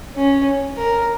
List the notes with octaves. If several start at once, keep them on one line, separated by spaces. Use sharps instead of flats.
C#4
A#4